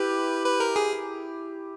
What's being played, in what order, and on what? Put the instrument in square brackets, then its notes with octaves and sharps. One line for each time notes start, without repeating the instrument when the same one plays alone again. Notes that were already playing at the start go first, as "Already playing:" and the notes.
Already playing: [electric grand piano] E4 G4 [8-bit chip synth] B4
[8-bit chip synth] B4
A#4
G#4